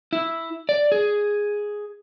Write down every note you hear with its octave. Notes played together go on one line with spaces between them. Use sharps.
E4
D5
G#4